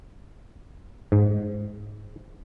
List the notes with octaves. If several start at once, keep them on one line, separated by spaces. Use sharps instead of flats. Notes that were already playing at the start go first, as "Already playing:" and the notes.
G#2